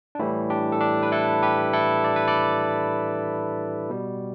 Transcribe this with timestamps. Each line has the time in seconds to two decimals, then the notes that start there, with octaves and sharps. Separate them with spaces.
0.15 D4
0.19 A2 E3 G3 E4
0.50 D4 G4
0.72 A4
0.81 D4 G4
1.03 B4
1.12 E4 A4
1.42 G4 B4
1.73 E4 A4
2.04 D5
2.16 B4
2.27 A4 D5
3.89 B2 G3